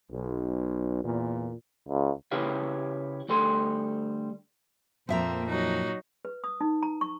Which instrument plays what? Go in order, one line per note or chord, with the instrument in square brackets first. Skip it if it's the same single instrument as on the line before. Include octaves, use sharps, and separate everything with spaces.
[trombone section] B1
E2 A#2
[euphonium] C#2
[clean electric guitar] C#3 E4 G4 B4 C#5 F5
D2 G3 A4 C6
[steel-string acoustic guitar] F2 E5 A#5 [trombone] A#2 [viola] A#3 C4
[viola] F#3 D#4
[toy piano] B4
D#6
D#4
A#5
C#6